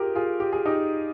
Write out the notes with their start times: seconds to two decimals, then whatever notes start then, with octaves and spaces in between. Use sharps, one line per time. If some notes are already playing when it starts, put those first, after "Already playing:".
Already playing: F4 G4 G#4 A#4
0.15 F4 G#4
0.40 G4
0.52 G#4
0.66 D#4 G4